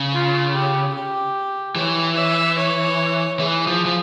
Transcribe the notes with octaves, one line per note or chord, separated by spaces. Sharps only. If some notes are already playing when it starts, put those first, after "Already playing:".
Already playing: C#3
F4
G4
G4
E3 C#5
E5
C#5
E3 G#4
F3
F3